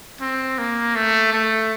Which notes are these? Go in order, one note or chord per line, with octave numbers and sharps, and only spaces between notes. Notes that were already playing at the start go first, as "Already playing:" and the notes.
C4
A#3
A3
A3